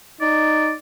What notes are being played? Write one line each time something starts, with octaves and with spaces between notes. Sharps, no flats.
D#4 D5